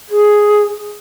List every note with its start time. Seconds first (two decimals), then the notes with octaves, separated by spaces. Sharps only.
0.09 G#4